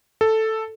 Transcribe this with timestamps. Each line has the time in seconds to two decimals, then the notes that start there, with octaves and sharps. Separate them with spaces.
0.21 A4